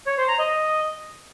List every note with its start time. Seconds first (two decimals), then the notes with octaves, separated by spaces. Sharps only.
0.07 C#5
0.17 C5
0.28 A#5
0.39 D#5